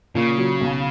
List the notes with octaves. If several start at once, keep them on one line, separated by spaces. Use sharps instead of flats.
A#2 C#3
F#3
B1